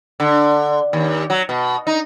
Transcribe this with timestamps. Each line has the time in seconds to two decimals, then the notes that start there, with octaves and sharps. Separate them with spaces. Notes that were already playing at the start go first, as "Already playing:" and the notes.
0.20 D3
0.93 D#2
1.30 F#3
1.49 B2
1.87 D#4